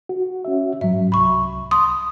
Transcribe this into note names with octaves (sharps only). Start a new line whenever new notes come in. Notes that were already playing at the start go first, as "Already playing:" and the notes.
F#4
C#4 F#4 E5
G#2 F#3 E5
C2 B5 C#6
C6 D#6